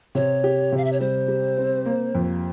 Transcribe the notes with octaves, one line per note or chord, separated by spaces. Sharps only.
C3 C#5
G4
C3
F5
E5
C#5
G3 C5
G3
C4
A#3
F2